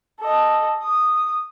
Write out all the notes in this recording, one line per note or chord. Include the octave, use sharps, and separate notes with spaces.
A4 D#5
D#6